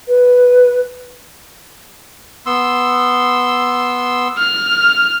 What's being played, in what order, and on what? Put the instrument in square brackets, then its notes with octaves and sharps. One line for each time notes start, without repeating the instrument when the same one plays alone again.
[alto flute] B4
[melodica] B3 C6 E6
[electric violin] F6